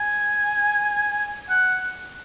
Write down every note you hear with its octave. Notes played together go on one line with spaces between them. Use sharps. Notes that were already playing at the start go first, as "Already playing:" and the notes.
Already playing: G#5
F#5